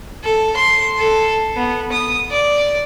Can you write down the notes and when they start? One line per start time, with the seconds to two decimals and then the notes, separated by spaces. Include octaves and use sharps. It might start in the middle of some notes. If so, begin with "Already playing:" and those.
0.24 A4
0.57 C6
0.98 A4
1.56 B3
1.92 D#6
2.31 D5